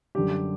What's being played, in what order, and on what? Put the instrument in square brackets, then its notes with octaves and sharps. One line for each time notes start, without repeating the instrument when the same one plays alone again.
[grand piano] F#2 D3 G3 G4